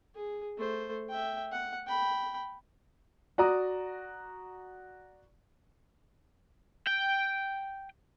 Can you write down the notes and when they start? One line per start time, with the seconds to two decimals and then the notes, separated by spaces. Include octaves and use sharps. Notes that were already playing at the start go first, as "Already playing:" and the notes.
0.15 G#4
0.58 A3 C5
1.10 E5 G5
1.52 F#5
1.87 G5 B5
3.38 F#4 D5 A#5 D#6
6.87 G5